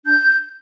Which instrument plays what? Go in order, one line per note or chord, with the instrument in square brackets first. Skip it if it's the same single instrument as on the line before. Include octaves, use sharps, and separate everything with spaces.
[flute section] D4 G6